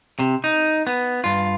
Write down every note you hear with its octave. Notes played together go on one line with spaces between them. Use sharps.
C3
D#4
B3
G2 F4